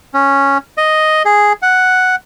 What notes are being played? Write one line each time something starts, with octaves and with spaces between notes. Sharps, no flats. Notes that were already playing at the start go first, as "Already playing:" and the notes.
C#4
D#5
G#4
F#5